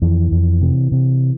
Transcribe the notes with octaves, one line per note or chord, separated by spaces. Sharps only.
F2 E3
F2
C3
C3